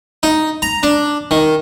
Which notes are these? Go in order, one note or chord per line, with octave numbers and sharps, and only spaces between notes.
D#4
A#5
D4
D#3